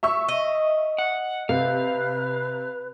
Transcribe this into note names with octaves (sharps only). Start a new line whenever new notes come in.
E5 C#6 E6
D#5
F#5
C3 B4 F5